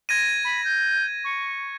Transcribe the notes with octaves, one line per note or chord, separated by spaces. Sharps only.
G#6 A#6 D#7
B5
G6
C#6